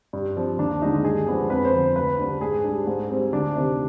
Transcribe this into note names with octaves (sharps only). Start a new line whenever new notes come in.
G2
F3 C4
D#2 D4
D3 G#3 D4 D#4
G2 G#4
F3 G#3 B3 D4
F2 B4
C5
D3 F3
D2 B4
D3 G3 D4
G#2 G#4
G3 D4
G#2
G3 C4
D2 D4
C3 D#3